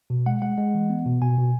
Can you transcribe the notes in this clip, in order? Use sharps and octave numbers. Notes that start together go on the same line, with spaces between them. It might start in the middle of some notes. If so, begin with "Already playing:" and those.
B2
G#3 F#5
G#3 F#5
G#3
E3
B3
B2
B2 G#5
B2